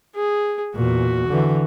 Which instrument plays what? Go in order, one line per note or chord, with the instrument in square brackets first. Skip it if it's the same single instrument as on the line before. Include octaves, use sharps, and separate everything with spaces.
[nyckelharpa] G#4
[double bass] E2 A#2 [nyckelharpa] F#4
[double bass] D3 E3